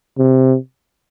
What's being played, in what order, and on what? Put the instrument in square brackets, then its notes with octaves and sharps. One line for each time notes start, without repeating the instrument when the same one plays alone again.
[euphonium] C3